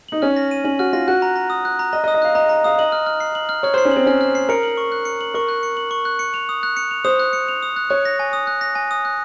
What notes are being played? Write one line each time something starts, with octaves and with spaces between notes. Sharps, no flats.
D#4 F#7
C#4 F6
A#6
D#7
C#4 F#7
F#4 F6
F4 A#6
F#4 F#6
A#5
A#5
D#6
F#6
A#5
D#5 A#5
D#5
D#6
D#5
F5 F#6
D#5 A#5
A#5
F5 D#6
D#5 F#7
F6
F6
C7
F#7
F6
C#5 F6
C5 C7
C#4
C4 F#7
C#4 F6
F6
C7
A#4 C#7
F#7
C#6
F#6
C#7
F#7
A#4 C#6
F#6
C#7
F#7
C#6
F#6
C#7
F7
D#6
F#6
C#7
F7
C5 D#6
F#6
C#7
F7
D#6
F#6
C#5 F#6
A#6
G#5
D#6
F#6
A#6
G#5
D#6
F#6